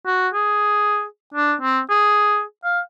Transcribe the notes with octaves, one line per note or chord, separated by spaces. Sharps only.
F#4
G#4
D4
C4
G#4
F5